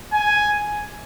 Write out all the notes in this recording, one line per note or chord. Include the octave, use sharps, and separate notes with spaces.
G#5